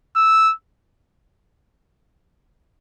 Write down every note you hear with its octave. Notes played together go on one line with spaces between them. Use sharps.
E6